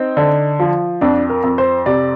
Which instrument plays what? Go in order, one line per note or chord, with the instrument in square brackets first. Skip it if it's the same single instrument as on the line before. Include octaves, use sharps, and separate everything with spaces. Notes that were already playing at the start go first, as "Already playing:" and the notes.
Already playing: [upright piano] C4 [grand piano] D#4
[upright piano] D3
F3
[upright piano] F2 [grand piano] D4
[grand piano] A#4
[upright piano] F2
[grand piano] C5
[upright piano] C3 [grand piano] D5